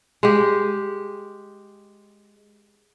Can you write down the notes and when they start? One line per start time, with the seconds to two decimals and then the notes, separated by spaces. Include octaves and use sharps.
0.23 G#3 G4